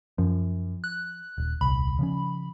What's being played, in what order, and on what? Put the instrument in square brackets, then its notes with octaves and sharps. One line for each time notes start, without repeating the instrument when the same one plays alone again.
[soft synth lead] F#2 [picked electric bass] F3
[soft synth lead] F#6
[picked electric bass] D#1
[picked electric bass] D#1 C2 [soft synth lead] B5
[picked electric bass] C#3 F3 C#4